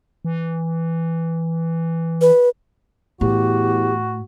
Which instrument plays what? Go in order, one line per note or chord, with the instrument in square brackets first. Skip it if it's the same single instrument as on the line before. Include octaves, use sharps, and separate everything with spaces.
[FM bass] E3
[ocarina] B4
[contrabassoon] E2 [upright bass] A2 [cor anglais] F#4 [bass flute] G4